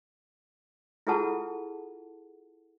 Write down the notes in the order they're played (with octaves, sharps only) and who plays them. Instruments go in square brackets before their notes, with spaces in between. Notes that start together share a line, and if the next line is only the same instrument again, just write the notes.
[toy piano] E4 F4 G#4 A4 F#5 A5